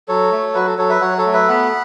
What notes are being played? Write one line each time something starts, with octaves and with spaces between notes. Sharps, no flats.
F#3 A4 C#5
A3
F#3 F#4 B4
A4
F#3 A4 C#5
B4 E5
F#3 C#5 F#5
A4 C#5
A3
B4 E5
B3 F#5 B5